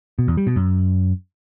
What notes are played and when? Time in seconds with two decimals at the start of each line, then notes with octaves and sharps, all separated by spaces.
0.19 B2
0.28 E2
0.37 G3
0.47 B2
0.56 F#2